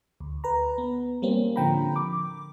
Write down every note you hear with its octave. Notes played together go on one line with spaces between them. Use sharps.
D2
B4 A#5
B3
G3 A#3 C4 C#4
A2 D3 F3 G5 A#5 B5
D6